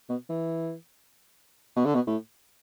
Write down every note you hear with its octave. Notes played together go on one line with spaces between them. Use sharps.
B2
E3
B2
D3
B2
A2